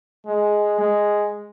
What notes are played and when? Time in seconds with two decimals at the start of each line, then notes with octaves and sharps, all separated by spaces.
0.27 G#3
0.79 G#3